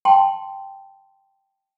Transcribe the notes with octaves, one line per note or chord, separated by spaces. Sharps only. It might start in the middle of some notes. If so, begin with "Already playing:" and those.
G5 A5 C6